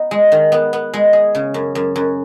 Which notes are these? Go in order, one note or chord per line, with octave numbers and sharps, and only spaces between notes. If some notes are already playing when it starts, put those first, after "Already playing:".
Already playing: B3 D#4
G#3
D#3
B3
B3
G#3
G#4
C#3
F#2
F#2
F#2